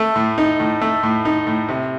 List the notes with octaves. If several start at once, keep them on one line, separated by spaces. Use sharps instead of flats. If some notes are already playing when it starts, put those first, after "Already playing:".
Already playing: A3
A2
D#4
A2
A3
A2
D#4
A2
C3